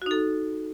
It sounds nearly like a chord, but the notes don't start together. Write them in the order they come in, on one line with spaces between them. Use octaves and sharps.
F#4 D#4 A4